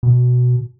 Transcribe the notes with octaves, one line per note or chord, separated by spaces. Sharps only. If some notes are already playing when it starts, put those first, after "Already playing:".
B2